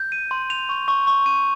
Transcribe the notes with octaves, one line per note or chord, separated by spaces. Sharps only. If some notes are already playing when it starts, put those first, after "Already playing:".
Already playing: G6
D#7
C6
F7
C#6
C#6
C#6
D#7